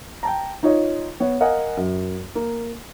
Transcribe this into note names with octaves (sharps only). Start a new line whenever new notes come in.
G5 A5 A#5
D#4 F4 C#5 D#5
B3 C#5
A#4 D#5 F5 F#5 G#5
F#2
A#3